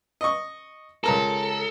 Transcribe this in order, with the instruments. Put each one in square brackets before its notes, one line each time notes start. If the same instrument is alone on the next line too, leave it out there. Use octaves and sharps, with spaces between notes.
[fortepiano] D#5 C#6
[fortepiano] C#2 A#4 A#5 [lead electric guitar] A4